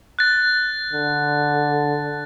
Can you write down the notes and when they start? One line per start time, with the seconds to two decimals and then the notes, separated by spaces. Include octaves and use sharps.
0.19 F#6 A6
0.92 D3